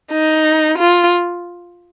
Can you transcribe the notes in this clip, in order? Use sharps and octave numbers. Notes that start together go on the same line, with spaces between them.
D#4
F4